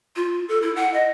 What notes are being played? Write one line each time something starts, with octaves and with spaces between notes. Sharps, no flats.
F4
A4
E4
F#5
D#5